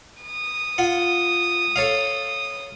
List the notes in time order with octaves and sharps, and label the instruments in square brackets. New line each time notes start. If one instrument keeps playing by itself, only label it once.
[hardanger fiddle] D#6
[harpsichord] F4 F#5
A4 C#5 F5